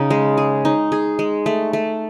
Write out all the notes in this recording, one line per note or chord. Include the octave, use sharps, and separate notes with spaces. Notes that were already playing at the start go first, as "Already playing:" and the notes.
Already playing: C#3 D#4
G#3
G#4
D#4
G#4
G#3
A3
A3